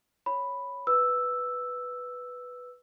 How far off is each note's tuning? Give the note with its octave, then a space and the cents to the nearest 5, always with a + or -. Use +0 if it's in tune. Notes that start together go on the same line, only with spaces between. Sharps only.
C#5 +0 B5 +0
B4 +0 E6 +0